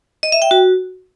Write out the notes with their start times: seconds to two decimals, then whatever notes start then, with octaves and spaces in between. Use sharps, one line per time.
0.23 D#5
0.32 E5
0.42 G5
0.51 F#4